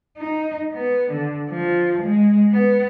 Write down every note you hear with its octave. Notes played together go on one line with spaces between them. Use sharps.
D#4
B3
D3
F3
G#3
B3